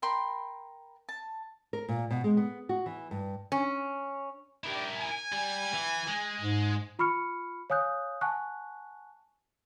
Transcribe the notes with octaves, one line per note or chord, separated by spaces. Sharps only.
A#4 G5 B5 C6
A5
A#4
A#2
B2
G#3
B3
F#4
E3
G2
C#4
D4 E4 G4 A#4
G#5
G3
E3
G#3
G#2
F4 B5 C#6 F6 C#7
C#5 F5 G#5 D#6 F#6 G6
F#5 G#5 A5 C#6 F#6